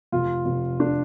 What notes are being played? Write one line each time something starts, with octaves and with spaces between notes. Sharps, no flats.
F1 F4
F1
D4